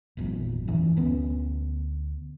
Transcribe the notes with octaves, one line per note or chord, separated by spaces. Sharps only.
G#1 E2 A#2 F#3
F#2 E3 F3
D2 B3 C#4